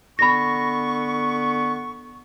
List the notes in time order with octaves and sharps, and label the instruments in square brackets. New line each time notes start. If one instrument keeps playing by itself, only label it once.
[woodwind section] D3 B3 C#6 [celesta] B5 A#6